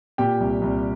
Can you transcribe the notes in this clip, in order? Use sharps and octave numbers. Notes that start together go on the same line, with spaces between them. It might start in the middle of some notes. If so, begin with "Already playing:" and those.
A#2 G4 G5
C2
C2